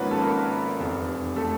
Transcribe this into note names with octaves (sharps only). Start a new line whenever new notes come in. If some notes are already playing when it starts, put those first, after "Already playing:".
Already playing: G#1 G#2 F3 A#3 B3 C#4 B4 C#5
A4
A#3 A#4
F1 E2 C3
A3 A4